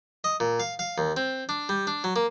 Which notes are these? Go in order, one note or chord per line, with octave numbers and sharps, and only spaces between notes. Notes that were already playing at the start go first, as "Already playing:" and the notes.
D#5
A#2
F5
F5
D#2
C4
D4
G3
D4
F#3
A#3